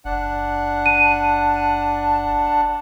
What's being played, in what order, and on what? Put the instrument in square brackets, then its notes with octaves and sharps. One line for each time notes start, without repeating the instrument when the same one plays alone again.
[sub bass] F#1 [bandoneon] D4 F#5
[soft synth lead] A5 [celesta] D#7